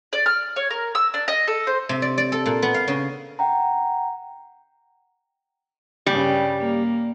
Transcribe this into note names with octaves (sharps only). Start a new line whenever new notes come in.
D5
F6
C#5
A#4
E6
D4
D#5
A4
C5
C3
D5
D5
A4
A#2
B3
F5
C#3
F#5 G5 A#5
G2 C#3 G3
A#3